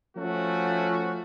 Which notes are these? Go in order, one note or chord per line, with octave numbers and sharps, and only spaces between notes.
F3 A3 C#4 F#4